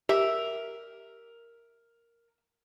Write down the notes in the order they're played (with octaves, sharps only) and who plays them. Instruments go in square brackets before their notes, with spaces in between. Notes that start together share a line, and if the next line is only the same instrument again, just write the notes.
[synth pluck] G4 [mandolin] A#4 [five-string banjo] E5